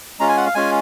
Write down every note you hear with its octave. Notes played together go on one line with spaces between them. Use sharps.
G#3 C#4 F4 A#5
G#5
F#5
F5
G#3 C#4 F4 G#5